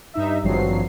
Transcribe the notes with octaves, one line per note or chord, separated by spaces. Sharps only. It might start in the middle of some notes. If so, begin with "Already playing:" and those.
G2 D#4 E5
G#1 G2 F3 F#3 C7